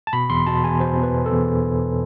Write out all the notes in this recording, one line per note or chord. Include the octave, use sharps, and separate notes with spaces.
A5
B2 B5
E2 C6
B2 A5
E2 G#5
B2 C5
E2
B4
B2
A4
E2